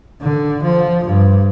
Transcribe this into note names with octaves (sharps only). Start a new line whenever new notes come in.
D3
F3
G2